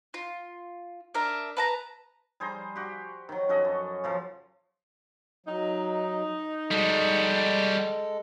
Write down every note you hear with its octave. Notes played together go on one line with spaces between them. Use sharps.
F4
D4 A#4 E5
B4 A5 A#5
G3 G#4 C5 A#5
F#4 G4
D#3 F#3
C#4 F#4 A4 D#5
F#2
C#3 F3 A4
F#3 D#4
G3 G#3 F#4 A4